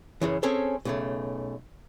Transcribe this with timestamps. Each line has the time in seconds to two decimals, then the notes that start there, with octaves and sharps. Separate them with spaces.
0.21 F#2 C#3 E3
0.43 C4 C#4 G#4 A4 C#5
0.85 B1 C#3 A3